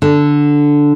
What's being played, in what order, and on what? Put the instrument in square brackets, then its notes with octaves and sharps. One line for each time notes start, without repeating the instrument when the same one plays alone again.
[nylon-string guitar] D3